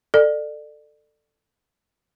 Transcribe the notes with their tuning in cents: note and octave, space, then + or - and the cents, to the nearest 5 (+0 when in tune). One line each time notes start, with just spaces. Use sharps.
A4 +15 D5 +30